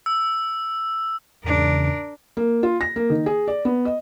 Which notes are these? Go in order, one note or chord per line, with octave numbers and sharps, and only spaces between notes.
E6
E2 G#2 C#3 D4 A#4
A#3
F4
A#6
A#3
D#3
G#4
D5
B3
D#5